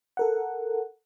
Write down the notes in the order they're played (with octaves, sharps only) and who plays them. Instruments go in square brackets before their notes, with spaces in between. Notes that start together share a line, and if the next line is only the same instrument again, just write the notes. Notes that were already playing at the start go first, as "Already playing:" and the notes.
[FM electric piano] A4 A#4 F#5